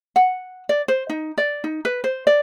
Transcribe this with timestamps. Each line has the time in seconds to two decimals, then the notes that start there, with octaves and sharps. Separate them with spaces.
0.16 F#5
0.69 D5
0.88 C5
1.09 D#4
1.38 D5
1.64 D#4
1.85 B4
2.04 C5
2.27 D5